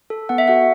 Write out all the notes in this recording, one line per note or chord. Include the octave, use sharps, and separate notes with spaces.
A4
B3 F#5
E5
F#4 A4 F#5